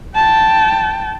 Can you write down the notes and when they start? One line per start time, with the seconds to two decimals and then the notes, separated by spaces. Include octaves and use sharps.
0.15 G5 A5